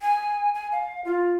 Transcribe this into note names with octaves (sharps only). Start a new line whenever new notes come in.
G#5
G#5
F5
F4